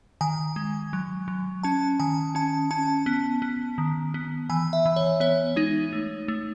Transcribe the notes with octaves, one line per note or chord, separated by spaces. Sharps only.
D#3 G#5
G#3
F#3
F#3
C#4 A5
D#3 G#5
C#4 A5
C#4 A5
B3
B3
D#3
B3
E3 G#5
E5
E3
C#5
B3 C#5
G#3 D#4
A3
A3